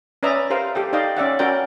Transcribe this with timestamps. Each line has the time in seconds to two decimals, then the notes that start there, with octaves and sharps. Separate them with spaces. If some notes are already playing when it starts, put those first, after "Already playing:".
0.23 C#4 B4 D5 E5 A#5 D#6
0.50 G4 A#4 C5 F5
0.75 G4 A4 G5
0.93 D#4 D5 D#5 F5 G5
1.17 C#4 D5 E5 F#5
1.39 C#4 F#4 A#4 D5 G5